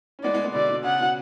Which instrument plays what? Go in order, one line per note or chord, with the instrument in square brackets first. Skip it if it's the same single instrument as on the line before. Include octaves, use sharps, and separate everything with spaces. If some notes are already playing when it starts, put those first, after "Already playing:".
[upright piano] C#4
[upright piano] G#3 B3 [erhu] D5
[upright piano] G#3 B3
G#3 B3
[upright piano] B2 D3 [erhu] D5
[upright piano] B2
[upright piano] C#3 [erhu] F#5
[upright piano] B2